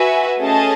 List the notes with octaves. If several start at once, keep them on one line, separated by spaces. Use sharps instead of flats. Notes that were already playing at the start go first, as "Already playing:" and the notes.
Already playing: F#4 B4 E5 G#5
A3 C#4 G#4 D#5 A5